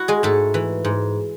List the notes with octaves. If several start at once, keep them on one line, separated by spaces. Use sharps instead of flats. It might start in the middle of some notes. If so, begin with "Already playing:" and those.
Already playing: E4 F#4
G#3 G#4
G#2 A3 A4
E3
G#2